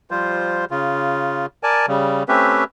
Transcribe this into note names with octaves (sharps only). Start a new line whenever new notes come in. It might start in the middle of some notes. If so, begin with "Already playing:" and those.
F3 G3 F4 C5
C#3 F4
A#4 D5 G#5 A5
C#3 G3
A3 C4 C#4 G4 B4 E5